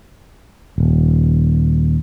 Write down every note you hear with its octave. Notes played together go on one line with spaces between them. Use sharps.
D#1